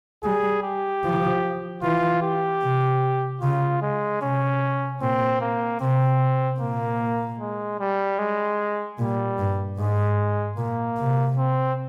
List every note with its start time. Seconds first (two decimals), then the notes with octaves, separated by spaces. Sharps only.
0.23 G3 G#4
0.63 G4
1.03 F3
1.82 E3 F4
2.22 G4
2.62 C3
3.41 C#3 F4
3.82 G#3
4.21 C3 C#4
5.01 A#2 C4
5.41 A#3
5.80 C3 C4
6.60 A#2 A#3
7.39 G#3
7.80 G3
8.19 G#3
8.98 A#2 G3
9.38 G2
9.78 G#2 G#3
10.57 A#2 A#3
10.98 C3
11.37 C4